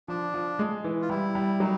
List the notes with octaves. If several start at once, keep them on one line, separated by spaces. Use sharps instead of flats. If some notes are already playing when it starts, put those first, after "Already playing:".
F3 D4
F3
G#3
E3
F4
G3 E4
G3
F#3 D#4